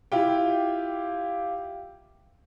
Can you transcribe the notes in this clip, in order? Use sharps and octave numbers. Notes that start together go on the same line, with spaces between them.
E4 F4 G4 G5